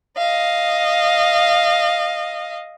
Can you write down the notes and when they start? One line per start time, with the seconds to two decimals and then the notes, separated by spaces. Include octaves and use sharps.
0.17 D#5 F5